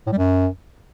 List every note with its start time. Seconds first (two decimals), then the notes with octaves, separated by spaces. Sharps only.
0.07 A2
0.12 G3
0.18 F#2